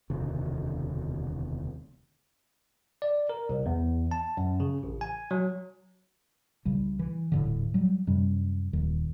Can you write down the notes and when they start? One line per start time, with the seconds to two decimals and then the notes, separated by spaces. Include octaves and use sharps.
0.10 E1 D2 C3 D#3
3.02 D5
3.29 A#4
3.49 C2
3.66 E2
4.11 A5
4.37 F#2
4.60 C#3
4.83 A1
5.01 G#5
5.31 F#3
6.65 C2 C#3 G3
6.99 E3
7.32 D#1 A2 D3
7.74 F#3 G3
8.07 F#2 C3 G3
8.73 D#1 D#2 D#3